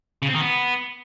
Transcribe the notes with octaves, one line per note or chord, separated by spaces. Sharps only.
C#3
C4
D#3
B3